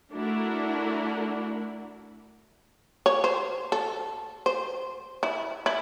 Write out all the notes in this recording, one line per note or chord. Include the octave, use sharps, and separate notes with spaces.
A3 D4 E4 F#4 A#4
C#5
C5
A4
C5
E4
E4